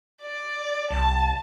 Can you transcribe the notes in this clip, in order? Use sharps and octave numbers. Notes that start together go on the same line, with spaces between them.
D5
C2 A5